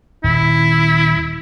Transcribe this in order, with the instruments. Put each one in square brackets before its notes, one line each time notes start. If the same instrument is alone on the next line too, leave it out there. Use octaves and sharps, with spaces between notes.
[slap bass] D#1 [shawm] E4